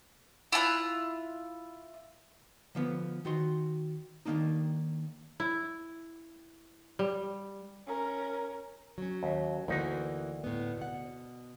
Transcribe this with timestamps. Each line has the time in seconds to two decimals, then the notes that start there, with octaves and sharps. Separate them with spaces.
0.52 E4 F4 G#5 F#6
2.75 D3 F3 B3
3.25 D#3 F#4 C6
4.26 D#3 A3 A#3 D4 D#4
5.40 E4
6.99 G3
7.87 C#4 A#4
8.98 F#3 C#4
9.23 D#2
9.68 D2 E3 A#3 D#4 F#4
10.44 A2 B3
10.78 B2 F#5